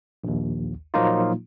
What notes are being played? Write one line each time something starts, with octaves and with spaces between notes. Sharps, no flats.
A#1 D#2
A#2 F3 F#3 A#3 D#4 F4